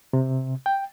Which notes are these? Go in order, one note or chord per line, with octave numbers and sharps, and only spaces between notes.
C3
G5